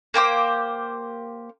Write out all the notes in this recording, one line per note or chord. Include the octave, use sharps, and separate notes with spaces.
A#3 G4 C5 D6